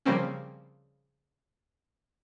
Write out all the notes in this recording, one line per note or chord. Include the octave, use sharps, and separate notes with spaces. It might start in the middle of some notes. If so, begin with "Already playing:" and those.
C#3 F3 G3 A#3 C4 C#4